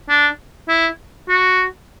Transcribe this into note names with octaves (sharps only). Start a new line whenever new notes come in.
D4
E4
F#4